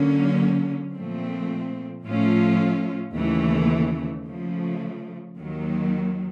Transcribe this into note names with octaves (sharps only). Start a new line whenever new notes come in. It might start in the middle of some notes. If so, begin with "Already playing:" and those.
Already playing: D3 F#3 A#3 C#4
A#2 F3 A3 C4
A2 F3 A3 C#4 F4
D#2 C#3 E3 A3
C#3 F3 A3
D#2 D#3 F#3